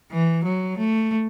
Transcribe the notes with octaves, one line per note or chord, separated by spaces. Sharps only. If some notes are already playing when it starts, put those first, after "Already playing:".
E3
F#3
A3